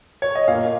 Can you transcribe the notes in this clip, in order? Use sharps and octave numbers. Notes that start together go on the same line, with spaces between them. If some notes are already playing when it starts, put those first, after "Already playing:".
C#5
D#5
A#2 A#3 F5